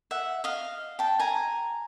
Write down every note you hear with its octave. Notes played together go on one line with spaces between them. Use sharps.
E5 F#5
D#5 F5
G5 A5
G#5 A#5